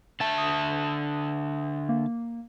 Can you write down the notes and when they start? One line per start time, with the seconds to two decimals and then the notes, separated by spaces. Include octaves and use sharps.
0.20 D3 E5 A5 A6
0.38 D#6
1.89 A#3